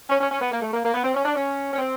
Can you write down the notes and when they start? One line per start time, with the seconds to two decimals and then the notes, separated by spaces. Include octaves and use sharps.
0.10 C#4
0.20 C#4
0.31 C#4
0.41 B3
0.52 A#3
0.62 A3
0.72 A#3
0.84 A#3
0.94 B3
1.04 C4
1.15 C#4
1.25 D4
1.36 C#4
1.74 C#4
1.78 C4